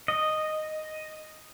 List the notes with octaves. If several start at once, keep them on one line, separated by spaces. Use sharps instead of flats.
D#5